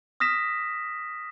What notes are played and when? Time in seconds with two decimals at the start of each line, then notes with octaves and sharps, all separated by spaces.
0.20 D#6 F6 A#6 B6 E7